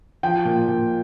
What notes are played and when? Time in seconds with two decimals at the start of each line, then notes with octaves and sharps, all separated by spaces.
0.23 F3 G5
0.45 A#2
0.68 A#2